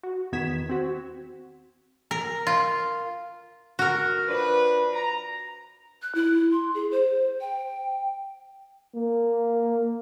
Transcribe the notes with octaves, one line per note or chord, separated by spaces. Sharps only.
F#4
E2 D#3 B3 G#6 B6 E7
C4 F#4
A#4
F4
F#4 A#4
F3 D4 B4
A#5
F#6
E4
C6
G#4
C5
G5
A#3